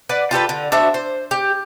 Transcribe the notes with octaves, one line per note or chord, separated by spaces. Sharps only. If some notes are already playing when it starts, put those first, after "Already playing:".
B4 D5 F#5
F4 G4 A4 B4
D3
D4 F#4 C5 E5
C5
G4